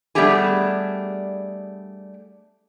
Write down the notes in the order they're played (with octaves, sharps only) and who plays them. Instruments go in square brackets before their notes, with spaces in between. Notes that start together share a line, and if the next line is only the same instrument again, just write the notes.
[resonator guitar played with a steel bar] G3 A3 B3 D4 G4 G#4